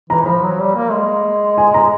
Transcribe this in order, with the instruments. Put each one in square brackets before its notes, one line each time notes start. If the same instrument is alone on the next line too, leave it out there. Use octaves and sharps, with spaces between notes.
[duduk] E3 [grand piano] A#5
[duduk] F3 [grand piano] B5
[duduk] F#3
G3
A#3
G#3
[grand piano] G#5
A#5